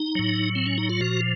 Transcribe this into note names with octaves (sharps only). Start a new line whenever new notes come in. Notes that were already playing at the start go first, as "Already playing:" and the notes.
Already playing: D#4
A2 F#3
C4
C#4
D#4
F4
A#2 F3 F#4